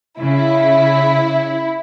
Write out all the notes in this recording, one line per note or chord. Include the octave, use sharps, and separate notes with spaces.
C#3 E4